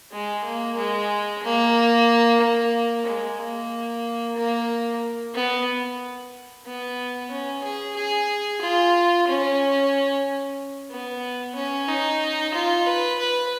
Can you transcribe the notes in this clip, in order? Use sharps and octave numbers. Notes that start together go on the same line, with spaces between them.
G#3
A#3
G#3
A#3
A#3
G#3
A#3
A#3
B3
B3
C#4
G#4
G#4
F4
C#4
B3
C#4
D#4
F4
B4
B4